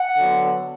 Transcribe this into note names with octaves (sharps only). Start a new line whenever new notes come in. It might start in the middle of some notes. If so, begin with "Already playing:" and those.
Already playing: F#5
D3 F#3 B3